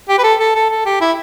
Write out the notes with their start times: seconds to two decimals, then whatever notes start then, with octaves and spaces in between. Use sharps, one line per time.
0.09 G4
0.19 B4
0.24 A4
0.40 A4
0.55 A4
0.70 A4
0.86 G4
1.01 E4